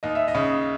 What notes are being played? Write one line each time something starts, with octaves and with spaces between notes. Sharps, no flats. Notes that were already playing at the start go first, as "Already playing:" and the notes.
D#2 D#5
E5
D#5
C#3